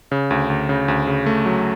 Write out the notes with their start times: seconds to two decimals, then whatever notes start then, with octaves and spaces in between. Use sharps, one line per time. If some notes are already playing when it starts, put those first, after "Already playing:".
0.12 C#3
0.31 D2
0.50 D2
0.69 C#3
0.88 D2
1.07 C#3
1.26 A3
1.46 F#3